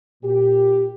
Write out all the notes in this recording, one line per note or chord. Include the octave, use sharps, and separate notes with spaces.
A#2 G4